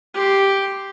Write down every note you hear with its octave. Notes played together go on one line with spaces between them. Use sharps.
G4 C6